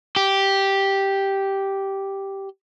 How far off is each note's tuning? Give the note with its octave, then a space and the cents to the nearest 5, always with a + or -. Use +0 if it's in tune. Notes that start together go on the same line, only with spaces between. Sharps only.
G4 -5